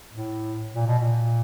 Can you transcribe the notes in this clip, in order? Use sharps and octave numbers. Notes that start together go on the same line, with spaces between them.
A2
A#2
B2
A#2